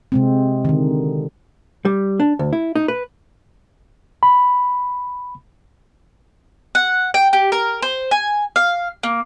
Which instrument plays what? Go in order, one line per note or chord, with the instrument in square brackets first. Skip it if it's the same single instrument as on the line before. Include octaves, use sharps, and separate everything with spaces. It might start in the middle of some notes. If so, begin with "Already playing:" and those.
[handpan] C3 G#3 C4
D3 D#3
[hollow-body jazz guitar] G3
D4
D2
E4
D#4
B4
[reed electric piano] B5
[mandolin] F#5
G5
G4
A#4
C5
G#5
F5
A#3